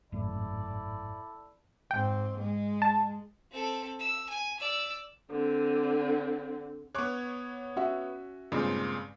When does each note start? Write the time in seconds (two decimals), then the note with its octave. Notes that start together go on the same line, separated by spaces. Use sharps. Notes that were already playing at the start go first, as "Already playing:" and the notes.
0.12 G#1 F#2 A2 E4 A4 D5
1.91 G#2 C4 G5
2.39 G#3
2.82 A5
3.52 C4 A4
3.99 E6
4.29 G#5
4.59 D5 E6
5.31 D3 C4
6.95 B3 C#5 C#6 D6 F#6
7.76 C#4 F#4 E5
8.52 G2 A#2 C#3 G#3 C4